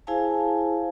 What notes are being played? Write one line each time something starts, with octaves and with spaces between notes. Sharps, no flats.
E4 G#4 C5 F5 G#5 A5